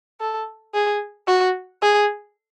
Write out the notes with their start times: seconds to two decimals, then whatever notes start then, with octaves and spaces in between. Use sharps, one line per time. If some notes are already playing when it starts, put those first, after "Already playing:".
0.21 A4
0.74 G#4
1.27 F#4
1.82 G#4